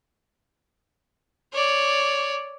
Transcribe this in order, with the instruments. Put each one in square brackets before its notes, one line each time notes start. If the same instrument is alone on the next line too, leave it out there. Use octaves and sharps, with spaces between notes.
[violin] C#5 D5